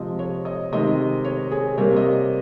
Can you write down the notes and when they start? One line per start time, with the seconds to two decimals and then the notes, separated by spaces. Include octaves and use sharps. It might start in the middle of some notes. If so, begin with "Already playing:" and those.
Already playing: C3 F3 G#3 D#5
0.19 C#5
0.45 D#5
0.72 C3 D#3 G#3 D#5
1.25 C#5
1.52 G#4
1.78 C3 G3 A#3 C#5
1.96 D#5